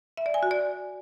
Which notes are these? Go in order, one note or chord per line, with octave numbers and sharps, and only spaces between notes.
E5
D5
G#5
F#4
D5